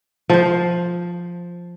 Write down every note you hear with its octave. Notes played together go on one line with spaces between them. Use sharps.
F3 C5